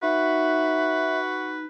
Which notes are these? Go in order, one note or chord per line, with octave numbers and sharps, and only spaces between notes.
D#4 F#4 B4 E5